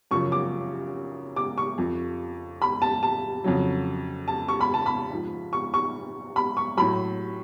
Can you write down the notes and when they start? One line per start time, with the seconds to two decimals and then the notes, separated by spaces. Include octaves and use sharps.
0.11 F#2 C#3 F3 C#6
0.32 D6
1.36 D6
1.58 C#6
1.78 F2 F3
2.62 B5
2.82 A5
3.03 A5
3.44 F2 C#3 F#3
4.28 A5
4.48 C#6
4.61 B5
4.74 A5
4.86 B5
5.11 G#2 F3
5.53 C#6
5.74 C#6
6.36 B5
6.57 C#6
6.77 A2 F#3 B5